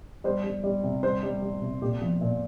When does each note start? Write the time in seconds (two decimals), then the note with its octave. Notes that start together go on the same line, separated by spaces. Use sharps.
0.24 G3 C5
0.44 G3
0.64 G3
0.83 C3
1.03 G3 C5
1.23 G3
1.42 G3
1.62 C3
1.82 A#2 G4
2.02 F3
2.21 A#2